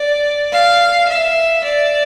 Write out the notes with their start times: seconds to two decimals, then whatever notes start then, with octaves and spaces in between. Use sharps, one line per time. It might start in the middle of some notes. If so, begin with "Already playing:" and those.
Already playing: D5
0.52 F5
1.08 E5
1.64 D5